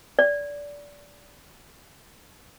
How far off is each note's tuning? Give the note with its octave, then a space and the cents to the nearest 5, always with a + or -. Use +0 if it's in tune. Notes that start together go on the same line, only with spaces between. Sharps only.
D5 -20